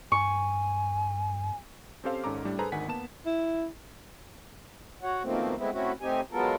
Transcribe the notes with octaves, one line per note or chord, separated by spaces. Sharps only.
G2 G#5 C#6
C4 C#4 G4 A4 C5 F5
G#1 G#2 C#4 A4 A#5 D6
A2 G3 D4
G#4 A4 B4 C5 A#5
G#1 D2 D#3 F#5 G#5 B6
A#3 B3 A5 E7
E4
F#4 C#5 F#5
B2 D#3 F3 A3 A#3 C4
G#3 A3 B3 C4 E4
A3 C4 C#4 E4 F#4
A2 C4 D#4 G4 G#5
F#3 G#3 B3 F4 A4 A#4